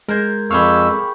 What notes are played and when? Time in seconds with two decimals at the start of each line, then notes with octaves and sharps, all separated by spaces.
0.08 G#3 A#4 C5 G#6
0.51 F2 G4 G#4 F5 B5 C#6 E6